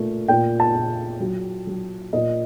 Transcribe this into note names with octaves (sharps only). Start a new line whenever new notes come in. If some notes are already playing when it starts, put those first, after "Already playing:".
Already playing: A#2 A3
A#2 G5
A5
A#2
F#3
F#3
A#2 D#5